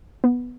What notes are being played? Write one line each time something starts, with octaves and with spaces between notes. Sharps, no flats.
B3